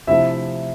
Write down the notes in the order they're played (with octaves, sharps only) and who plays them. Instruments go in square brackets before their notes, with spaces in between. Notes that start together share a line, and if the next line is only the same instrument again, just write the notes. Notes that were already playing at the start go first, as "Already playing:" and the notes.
[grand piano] C3 F3 A3 E4 E5